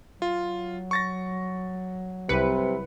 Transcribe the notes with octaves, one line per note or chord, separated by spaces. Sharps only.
F#3 F4
C#6 A6 A#6
C2 C3 B4 C#7